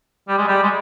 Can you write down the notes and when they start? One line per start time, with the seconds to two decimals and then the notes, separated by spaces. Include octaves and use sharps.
0.28 G3
0.38 G#3
0.48 G3
0.63 G#3